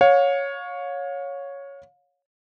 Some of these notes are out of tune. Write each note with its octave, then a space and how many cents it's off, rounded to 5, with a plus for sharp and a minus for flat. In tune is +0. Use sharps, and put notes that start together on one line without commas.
C#5 +0 F5 +35